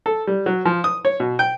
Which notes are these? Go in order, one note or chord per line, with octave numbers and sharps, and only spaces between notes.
A4
G3
F#3
F3
D#6
C#5
B2
G5